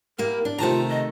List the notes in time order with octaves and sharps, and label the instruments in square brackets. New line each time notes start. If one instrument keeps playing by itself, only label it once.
[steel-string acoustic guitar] A#3 E4 G4 [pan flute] A#4
[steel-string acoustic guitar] D4
[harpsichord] C3 A5 A#5 [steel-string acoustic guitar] D#3 A3 [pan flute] F4
[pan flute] D#5